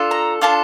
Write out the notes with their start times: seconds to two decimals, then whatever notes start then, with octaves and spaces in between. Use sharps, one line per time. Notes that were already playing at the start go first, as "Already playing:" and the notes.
Already playing: D4 F4 A4
0.11 A#5
0.41 D4 F4 A4 A5